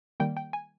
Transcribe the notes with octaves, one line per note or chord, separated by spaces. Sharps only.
D#3 G3 A#3 G5
G5
G#5